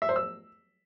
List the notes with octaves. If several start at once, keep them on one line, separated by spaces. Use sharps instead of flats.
E5
C5
E6